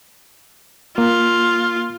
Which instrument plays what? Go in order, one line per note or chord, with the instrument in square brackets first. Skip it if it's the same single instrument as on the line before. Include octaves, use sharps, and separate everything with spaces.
[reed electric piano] A#3 [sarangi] F4